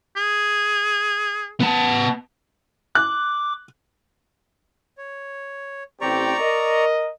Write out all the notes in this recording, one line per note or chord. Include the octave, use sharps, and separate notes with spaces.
G#4
B3 A5
D6 F#6
C#5
A1 C4 G4 D5 A#5 C#6
A#4 D#5